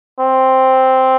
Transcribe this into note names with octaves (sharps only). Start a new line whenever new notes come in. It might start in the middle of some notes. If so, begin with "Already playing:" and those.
C4